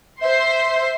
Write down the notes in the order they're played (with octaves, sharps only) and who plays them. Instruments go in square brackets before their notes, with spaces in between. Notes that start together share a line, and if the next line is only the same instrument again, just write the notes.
[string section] C5 C6 [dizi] E5